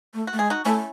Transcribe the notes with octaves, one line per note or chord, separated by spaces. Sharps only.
A3
F#4
A3
G#3 G#4
D#4 F#4
A3 C#4 E4